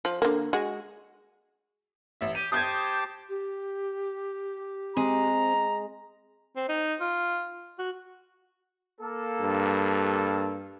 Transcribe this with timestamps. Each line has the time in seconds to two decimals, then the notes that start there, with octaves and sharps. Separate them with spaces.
0.05 F3
0.22 D3 A#3
0.53 G#3 F#4
2.21 A1 E5
2.35 G4 D#7
2.52 G4 C5 A5 D6 D#6 G6 G#6
3.30 G4
4.97 G#3 C4 A#5
6.56 C4
6.69 D#4
7.01 F4
7.79 F#4
9.01 A#3 A4
9.40 G2